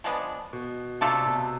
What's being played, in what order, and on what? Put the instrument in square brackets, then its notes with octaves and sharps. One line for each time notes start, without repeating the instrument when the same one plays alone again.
[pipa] F3 G#3 B3 D4
[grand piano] B2
[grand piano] C3 [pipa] A3 D4 F4 A4
[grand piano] B2